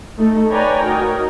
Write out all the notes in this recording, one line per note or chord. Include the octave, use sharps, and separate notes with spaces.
A3 D#4 A4
B4 C#5 D5 G5 G#5 A#5
D#4 F#4 A#4